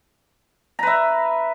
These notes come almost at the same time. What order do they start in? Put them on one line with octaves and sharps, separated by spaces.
A#5 B4 E5